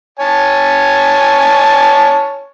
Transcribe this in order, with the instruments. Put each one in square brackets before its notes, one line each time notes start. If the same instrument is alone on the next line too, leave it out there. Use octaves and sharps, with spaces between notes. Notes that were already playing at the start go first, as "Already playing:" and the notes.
[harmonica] C#5 G#5 A5